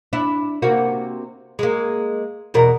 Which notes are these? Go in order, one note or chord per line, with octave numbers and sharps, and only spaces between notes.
D4 E4
C3 A#3 F#4
G#3 A#3
E2 B2 A#4